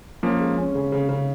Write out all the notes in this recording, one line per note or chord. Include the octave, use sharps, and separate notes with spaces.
F3 A#3 C#4
G#3
C#4
C#3
C#3
C#3